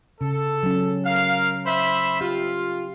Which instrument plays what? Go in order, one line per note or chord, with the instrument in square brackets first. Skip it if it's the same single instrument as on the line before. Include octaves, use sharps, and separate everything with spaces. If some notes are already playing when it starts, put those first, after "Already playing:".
[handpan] C#3 [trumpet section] A4
[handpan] F#3 C#4
[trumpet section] A#4 F5
C5 E5 B5
[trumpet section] F4 [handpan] G4